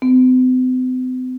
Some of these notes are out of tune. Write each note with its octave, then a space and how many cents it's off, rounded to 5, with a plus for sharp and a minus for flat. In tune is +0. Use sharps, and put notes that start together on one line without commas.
C4 -45